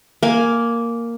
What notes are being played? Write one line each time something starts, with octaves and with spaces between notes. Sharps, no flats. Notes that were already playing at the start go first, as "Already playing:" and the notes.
A#3 G#5